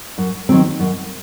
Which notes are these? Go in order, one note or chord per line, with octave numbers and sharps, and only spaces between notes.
F#2
D#3 F#3 C4
F#2